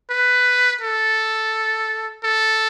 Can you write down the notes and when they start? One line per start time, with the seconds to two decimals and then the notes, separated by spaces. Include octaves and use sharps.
0.10 B4
0.81 A4
2.24 A4